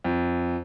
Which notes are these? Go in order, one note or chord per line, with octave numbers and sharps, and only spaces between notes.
F2